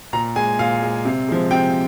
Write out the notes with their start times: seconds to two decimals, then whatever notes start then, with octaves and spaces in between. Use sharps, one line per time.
0.13 A#2 A#5
0.36 G#3 G#5
0.59 A#2 F5
0.82 G#3
1.05 C3
1.29 F3 G#3
1.51 C3 G5